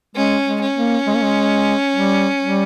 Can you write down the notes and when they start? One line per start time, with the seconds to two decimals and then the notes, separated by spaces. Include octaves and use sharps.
0.15 G#3 C#4
0.45 G#3
0.61 C#4
0.76 A#3
1.07 G#3
1.15 A#3
1.23 G#3
1.96 G3
2.42 G3